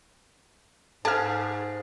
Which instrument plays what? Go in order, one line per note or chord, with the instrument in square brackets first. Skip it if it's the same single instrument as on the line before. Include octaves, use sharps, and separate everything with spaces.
[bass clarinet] G#2 [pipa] G#4 [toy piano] A4 F5 [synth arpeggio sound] A5 F6